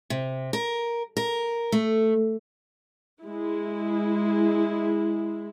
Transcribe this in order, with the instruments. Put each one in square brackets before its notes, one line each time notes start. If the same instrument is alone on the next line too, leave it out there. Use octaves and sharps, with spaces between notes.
[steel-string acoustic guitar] C3
A#4
A#4
A3
[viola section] G#3 E4